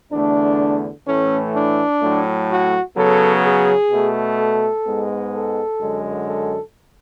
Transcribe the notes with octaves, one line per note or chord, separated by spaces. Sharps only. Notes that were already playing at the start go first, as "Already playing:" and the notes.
E2 D3 A3 D4
A2 E3 A3 C#4
D4
A2 F#3 A3
F#4
C#3 F#3 B3 A4
G#4
B2 A3
A4
G#2 G#3 B3
A4
F#2 D3 G#3
A4